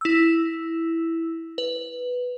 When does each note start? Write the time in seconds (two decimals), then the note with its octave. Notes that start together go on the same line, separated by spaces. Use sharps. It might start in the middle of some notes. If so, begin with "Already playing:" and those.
0.01 E4 E6
1.58 B4